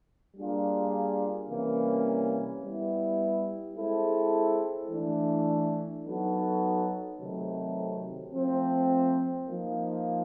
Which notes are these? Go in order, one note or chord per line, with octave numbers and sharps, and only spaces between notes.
G3 A#3 D4 F4 G#4
C3 E3 G3 A#3 C#4
G3 B3 E4
G#3 C4 E4 A4
E3 A3 D4
F#3 B3 D#4 F#4 A4
C3 D#3 F#3 A3 C4
F3 A3 C4
F3 A#3 D#4